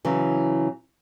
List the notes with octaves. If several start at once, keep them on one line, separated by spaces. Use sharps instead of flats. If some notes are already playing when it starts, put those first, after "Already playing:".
C#3 E3 F#3